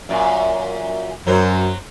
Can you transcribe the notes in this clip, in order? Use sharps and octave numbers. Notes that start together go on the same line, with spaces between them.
F#2 A#2
F#2 F#3 C5